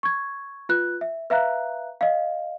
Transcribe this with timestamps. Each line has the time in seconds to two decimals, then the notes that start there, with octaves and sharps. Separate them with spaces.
0.03 C#6 G#6
0.69 F4 B4 F#6
1.01 E5
1.30 B4 E5 F5 A#5 F#6
2.01 D#5 F5